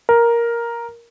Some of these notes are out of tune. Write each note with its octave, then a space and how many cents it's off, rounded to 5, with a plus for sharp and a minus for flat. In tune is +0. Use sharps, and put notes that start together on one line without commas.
A#4 +5